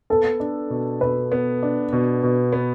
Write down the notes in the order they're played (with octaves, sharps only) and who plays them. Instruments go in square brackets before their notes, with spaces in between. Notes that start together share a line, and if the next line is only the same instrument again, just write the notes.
[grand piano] B3 [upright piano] A4
[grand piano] D4
B2
[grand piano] B2 [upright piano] B4
[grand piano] B3
D4
B2
B2
B3